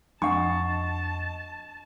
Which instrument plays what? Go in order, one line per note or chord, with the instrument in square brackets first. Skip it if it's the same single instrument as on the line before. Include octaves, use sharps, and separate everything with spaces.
[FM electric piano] F2 D#5 [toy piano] D4 F#5 [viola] A5 [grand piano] C#6